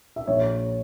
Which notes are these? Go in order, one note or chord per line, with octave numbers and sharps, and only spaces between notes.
E5
A#1 C#5